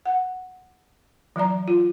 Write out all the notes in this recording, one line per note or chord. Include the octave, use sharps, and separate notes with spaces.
F#5
E3 F#3 D5 A#5
F4